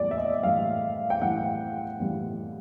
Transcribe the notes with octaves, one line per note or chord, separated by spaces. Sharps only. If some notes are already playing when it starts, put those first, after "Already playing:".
Already playing: A2 E3 G3 D5
E5
D#5
A2 E3 G3 F5
G5
A2 E3 G3 F#5
A2 E3 G3